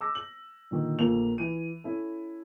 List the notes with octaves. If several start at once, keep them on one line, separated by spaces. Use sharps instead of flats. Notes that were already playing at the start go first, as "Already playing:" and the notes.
D6 E6 A#6
F#7
A#2 D3 D#3
A#1 A3 A#3 F4 F7
E3 D#7
C#4 E4 A4